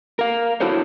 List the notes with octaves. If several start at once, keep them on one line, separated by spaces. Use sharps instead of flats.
A#4 F5
D4 E4 F#4 A4 C5 C#5